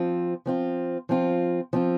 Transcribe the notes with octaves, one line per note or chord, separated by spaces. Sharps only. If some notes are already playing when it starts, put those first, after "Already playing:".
Already playing: F3 C4 F4
F3 C4 F4
F3 C4 F4
F3 C4 F4